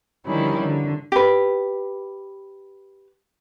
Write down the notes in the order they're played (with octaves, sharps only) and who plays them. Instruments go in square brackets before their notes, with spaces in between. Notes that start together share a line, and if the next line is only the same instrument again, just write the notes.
[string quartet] D3 D#3 F3 G3 C#4 E4
D3
[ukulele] G4 B4